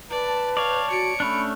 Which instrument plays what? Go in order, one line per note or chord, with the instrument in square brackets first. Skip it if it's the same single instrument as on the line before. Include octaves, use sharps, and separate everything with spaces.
[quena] B4 [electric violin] D5 [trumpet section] A5
[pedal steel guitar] C#5 D5 [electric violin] F5
[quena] F#4 [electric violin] C#7 D7
[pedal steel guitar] A3 C#4 D4 [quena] B5